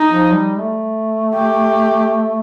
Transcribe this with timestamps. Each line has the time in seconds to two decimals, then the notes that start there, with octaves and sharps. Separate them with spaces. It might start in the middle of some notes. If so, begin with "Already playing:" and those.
Already playing: D#4
0.09 F3
0.34 G3
0.58 A3
1.34 G4